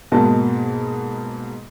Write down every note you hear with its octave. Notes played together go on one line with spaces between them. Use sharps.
G#2 B2 A#3 D#5 A5